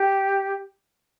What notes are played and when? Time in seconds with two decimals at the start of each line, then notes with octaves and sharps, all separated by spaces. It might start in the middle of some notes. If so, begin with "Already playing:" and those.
Already playing: G4